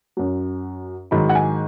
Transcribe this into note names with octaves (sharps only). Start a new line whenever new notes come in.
F#2 F#3
G#2 D#3 F#3 B5
F#5
G#5